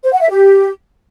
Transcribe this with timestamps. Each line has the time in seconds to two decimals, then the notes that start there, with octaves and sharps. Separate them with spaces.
0.04 C5
0.12 F#5
0.21 E5
0.30 G4